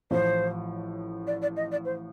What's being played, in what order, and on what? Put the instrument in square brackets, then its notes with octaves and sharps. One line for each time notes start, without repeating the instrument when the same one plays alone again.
[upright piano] A1 A2 F3 [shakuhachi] C5
[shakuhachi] D5
D5
D#5
D5
C5